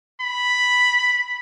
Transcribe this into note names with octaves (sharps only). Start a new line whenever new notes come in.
B5